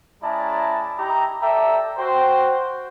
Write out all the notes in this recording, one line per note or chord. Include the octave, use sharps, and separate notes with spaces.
G#3 C#4 E4 D5 A5 A#5
D#4 E4 G4 A#5
A4 D5 E5 G5 A#5
F#4 C5 G5